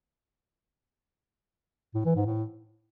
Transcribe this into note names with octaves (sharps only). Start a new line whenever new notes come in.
A2
E3
G#2
A2